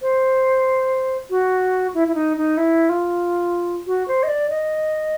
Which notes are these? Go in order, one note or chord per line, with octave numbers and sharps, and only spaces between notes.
C5
F#4
E4
E4
D#4
D#4
E4
F4
F#4
C5
D#5
D5
D#5